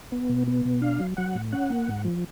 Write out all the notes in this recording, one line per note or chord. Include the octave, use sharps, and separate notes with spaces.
B3
B2
B3
B2
D4 F5
F#3
F#3 F#5
A2
C#4 F#5
A#3
G#2
F3